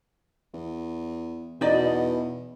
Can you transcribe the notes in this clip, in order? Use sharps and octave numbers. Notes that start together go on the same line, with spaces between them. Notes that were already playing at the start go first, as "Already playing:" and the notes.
E2
E2 B2 D#4 D5 D#5